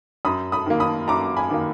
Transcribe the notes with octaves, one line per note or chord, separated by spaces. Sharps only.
F#2 B5 D#6
B5 D#6
D#3 A#3
B5 D#6
F#2 A#5 D6
G#5 B5
D#3 A#3